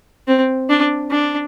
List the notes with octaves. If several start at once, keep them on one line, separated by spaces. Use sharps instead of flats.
C4
D4
D4